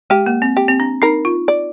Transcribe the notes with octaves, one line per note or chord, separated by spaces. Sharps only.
G#3 G4
A#3
C4
G4
C4
D4
D#4 A#4
F4
D5